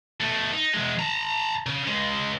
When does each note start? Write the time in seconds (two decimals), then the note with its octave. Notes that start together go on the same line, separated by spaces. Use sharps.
0.21 B2 A3
0.53 D#4
0.74 E2 G#3
1.00 A5 A#5
1.66 C#3
1.87 C#2 G#3